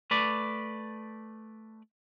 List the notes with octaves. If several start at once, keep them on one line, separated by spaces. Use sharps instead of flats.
A3 B4 D5